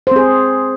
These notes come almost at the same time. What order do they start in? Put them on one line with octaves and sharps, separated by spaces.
C5 C4 G#4